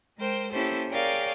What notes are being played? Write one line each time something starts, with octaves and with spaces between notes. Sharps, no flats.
G#3 A#4 C5 G5
A#3 C#4 E4 G4 A4 C5
G#4 A#4 C#5 D5 F5 G5